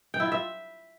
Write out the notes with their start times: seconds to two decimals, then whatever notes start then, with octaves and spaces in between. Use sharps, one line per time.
0.14 G5
0.20 E4
0.26 F4
0.32 E5